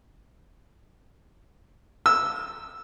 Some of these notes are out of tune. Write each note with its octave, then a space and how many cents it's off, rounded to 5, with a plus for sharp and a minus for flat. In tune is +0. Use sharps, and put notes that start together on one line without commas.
E6 -5